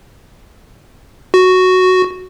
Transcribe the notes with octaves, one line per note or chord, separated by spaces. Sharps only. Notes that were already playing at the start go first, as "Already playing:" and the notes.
F#4